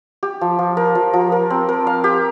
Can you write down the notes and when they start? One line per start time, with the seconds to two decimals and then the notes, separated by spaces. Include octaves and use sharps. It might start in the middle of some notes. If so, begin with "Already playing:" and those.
0.23 G4
0.41 F3
0.59 F3
0.77 A#4
0.95 F3
1.14 F3
1.32 A#4
1.50 C4
1.69 A#4
1.87 F5
2.04 G4